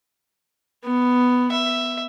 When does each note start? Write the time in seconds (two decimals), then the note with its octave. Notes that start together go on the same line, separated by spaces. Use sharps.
0.84 B3
1.52 E5